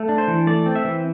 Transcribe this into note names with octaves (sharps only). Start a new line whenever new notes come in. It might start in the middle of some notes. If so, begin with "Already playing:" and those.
Already playing: A3
D4
C5
E3
A3 D5
C4
E5
E3